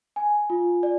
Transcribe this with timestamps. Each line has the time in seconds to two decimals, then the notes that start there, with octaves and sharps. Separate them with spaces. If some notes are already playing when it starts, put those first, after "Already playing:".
0.16 G#5
0.50 F4
0.83 D5